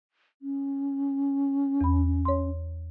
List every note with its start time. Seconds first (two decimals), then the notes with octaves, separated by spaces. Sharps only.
0.42 C#4
1.81 E2 B5
2.25 C#5 C6